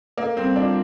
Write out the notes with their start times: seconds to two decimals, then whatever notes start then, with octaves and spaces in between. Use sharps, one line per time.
0.17 A#3 A4
0.36 G3 C4
0.55 D4 F4